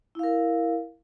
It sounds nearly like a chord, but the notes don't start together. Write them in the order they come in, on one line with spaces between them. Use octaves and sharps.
E4 F5 A#4